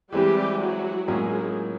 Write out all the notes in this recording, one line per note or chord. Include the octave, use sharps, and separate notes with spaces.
E3 G3 G#3 C4 E4 G4
F#3 F#4
A2 F#3 G#3 A#3 C#4 F4 G#4